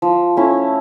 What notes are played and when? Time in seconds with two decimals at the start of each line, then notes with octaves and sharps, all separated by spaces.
0.02 F3
0.37 A3 C#4 E4